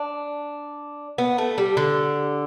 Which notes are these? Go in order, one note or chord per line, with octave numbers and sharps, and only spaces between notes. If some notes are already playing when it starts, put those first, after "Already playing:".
Already playing: D4
B3
A3
G3
D3